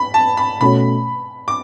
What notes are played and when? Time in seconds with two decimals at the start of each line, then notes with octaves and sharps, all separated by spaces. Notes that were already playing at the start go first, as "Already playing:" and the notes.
Already playing: B5
0.14 A5
0.37 B5
0.60 B2 A3 C#4 F#4 C#5 B5
1.48 D6